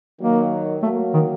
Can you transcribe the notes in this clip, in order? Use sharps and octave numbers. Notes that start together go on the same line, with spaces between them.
D#3 F#3 A#3
F#3 A3 A#3
D#3